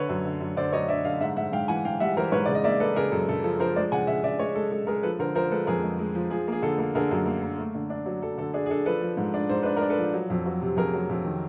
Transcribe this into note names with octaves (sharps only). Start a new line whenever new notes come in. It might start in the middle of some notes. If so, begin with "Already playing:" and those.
Already playing: D3 B4 C#5
F#2
D3
F#2
D3 C5 D5
F#2 C#5 D#5
D3 D5 E5
D3 D#5 F5
G#2 E5 F#5
G#2 E5 F#5
G#2 F5 G5
E3 F#5 G#5
G#2 F5 G5
G3 E5 F#5
E3 A#4 C5
G#2 B4 C#5
C#3 D5
D#5
A#3 D5 E5
A#3 A4 B4
C#3 G#4 A#4
F#2 A4
C#3 A4
F3 A4
F3 A#4 C5
G#3 C5 D5
C#3 F#5 G#5
C#3 E5 F#5
C#3 D5 E5
G#3 C#5 D#5
G#3 A4
G#3 A4
G#3 G#4 A#4
F3 A4 B4
D3 A#4 C5
F3 A#4 C5
G#3 A4 B4
F2 G#4 A#4
G#3
G#3
F3
F3 G#4
A#3 G#4
D3 A4
A#3
D3 G#4 A#4
F#2
A#3
A#3
A3
D3
D4
F#3
F#3 A4
D3 A4
D4 G#4
G#4
D4 A4
F3 A4 B4
F3
G#2
D4
G#2 C5
D4 B4
D4 A#4
A4 B4
F3
F#3
F2
F#3
C3
F2 G#4 A#4
F#3
F2
D#3